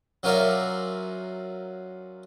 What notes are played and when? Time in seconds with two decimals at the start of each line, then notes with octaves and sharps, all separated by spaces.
0.23 F#3 C#4 F4 A#4 D5 E5